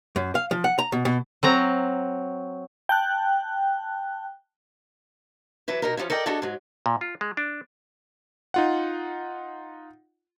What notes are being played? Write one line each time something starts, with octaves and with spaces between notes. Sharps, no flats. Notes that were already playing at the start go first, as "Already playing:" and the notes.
F#2
F5
F3
F#5
A#5
B2
B2
F#3 C4 A#5
G5 A5 F#6
E3 F#3 E4 B4
B2 D#4 A#4
D3 E3 F3 C#4
A4 A#4 D5 D#5 G5
D4 E4 F#4 G#4 A4 D#5
G#2 F#3
A#2
F4
G#3
D4
D#4 F4 F#5